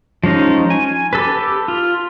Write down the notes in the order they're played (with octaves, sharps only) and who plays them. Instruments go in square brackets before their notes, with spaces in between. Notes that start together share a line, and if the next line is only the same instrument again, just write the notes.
[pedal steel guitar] F3 G#3 C#4 D#4
G#5
G4 A4 B4
F4